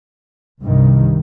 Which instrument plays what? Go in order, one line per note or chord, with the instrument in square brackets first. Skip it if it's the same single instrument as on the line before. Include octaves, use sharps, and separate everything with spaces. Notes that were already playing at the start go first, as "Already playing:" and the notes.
[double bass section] C2 G2 C3 D#3